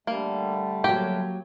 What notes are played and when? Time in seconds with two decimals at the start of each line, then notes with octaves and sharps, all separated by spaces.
0.07 D3 G3 A3 A#3
0.84 F#3 A#3 G4